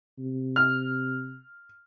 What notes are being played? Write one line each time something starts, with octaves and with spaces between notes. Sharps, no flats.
C3
F6